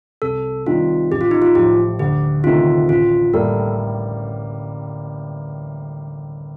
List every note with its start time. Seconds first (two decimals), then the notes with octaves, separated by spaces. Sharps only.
0.22 C2 A4
0.66 C3 D#3 G3 F4
1.11 A1 G4
1.21 F4
1.31 D#4
1.42 F4
1.55 A2 F3 G4
1.99 D2 G4
2.44 C3 D#3 A3 F4
2.89 A1 F4
3.33 A2 G3 A#3 A4